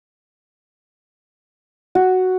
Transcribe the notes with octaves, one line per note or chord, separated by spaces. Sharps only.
F#4